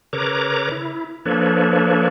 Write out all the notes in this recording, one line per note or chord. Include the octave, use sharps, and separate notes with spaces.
C#3 A#4 B4 C#5 A#5 D6
E4
F3 A#3 D4 A4 B4 C#5